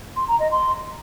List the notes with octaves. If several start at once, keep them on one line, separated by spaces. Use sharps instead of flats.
C6
A#5
D#5
C6